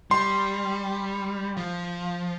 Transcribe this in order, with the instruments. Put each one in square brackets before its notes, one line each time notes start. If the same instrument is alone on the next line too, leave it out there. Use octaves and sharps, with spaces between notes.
[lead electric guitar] G3 [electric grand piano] C6
[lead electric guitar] F3